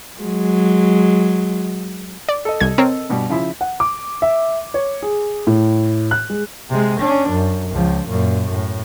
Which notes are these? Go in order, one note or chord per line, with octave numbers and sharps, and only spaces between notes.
F#3 G#3
D5
A4 D#5
C2 G#6
C4 A#4 C#5
G2 B2 G3
C#3 F3 E4
F#5
D6
E5
C#5
G#4
A2
F#6
G#3
C3 G#3
C#4 D4
F#2
C#2 F3
F#2 A#2
A2